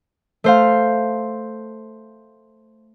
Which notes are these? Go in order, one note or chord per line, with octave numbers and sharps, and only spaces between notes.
A3 C5 F5